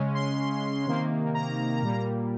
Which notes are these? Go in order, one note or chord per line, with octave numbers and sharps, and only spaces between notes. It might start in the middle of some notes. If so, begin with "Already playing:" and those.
Already playing: C#3 G#3 C#4
C6
C3 D#3 A#3
A#5
A#2 G3 A#3